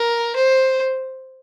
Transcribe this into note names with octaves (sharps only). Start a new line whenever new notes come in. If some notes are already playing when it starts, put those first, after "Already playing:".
Already playing: A#4
C5